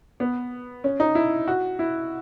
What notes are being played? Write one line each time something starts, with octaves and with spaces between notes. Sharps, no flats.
B3
C#4
D#4
E4
F#4
E4